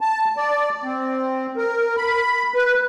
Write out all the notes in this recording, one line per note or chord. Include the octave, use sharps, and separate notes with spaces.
A5
D5
C4
A#4
B5
B4